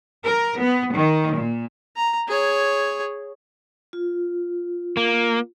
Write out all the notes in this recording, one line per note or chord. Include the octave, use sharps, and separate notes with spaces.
A#4
B3
D#3
A#2
A#5
G#4 C#5
F4
A#3